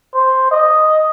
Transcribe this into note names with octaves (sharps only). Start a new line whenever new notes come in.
C5
D#5